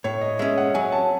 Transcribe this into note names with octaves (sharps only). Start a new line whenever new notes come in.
A2 C#5
D#5
G#3 C#4 E5
F#5
F#3 G#5
A5